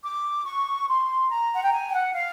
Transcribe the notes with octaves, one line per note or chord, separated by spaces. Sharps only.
D6
C#6
C6
A#5
F#5
G5
G#5
G5
F#5
F5